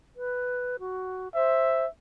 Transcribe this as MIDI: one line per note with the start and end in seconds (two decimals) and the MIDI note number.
0.16 0.76 71
0.79 1.28 66
1.35 1.85 72
1.35 1.88 76